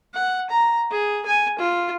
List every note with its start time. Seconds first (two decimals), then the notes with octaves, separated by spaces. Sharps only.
0.14 F#5
0.50 A#5
0.91 G#4
1.26 G#5
1.59 F4